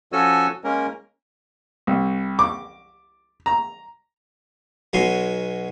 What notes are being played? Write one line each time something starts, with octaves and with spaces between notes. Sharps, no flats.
F3 C#4 F#4 A4 G#5 E6
G#3 A#3 C#4 A#4
C2
D6
A#5
B1 B2 F#3 G#5 C6